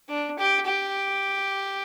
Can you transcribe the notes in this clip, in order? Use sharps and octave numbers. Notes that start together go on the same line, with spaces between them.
D4
G4
G4